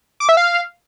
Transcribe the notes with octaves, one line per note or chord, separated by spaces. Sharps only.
D6
E5
F5